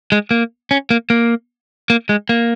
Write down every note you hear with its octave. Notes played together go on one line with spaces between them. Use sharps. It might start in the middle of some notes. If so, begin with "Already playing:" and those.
G#3
A#3
C#4
A#3
A#3
A#3
G#3
A#3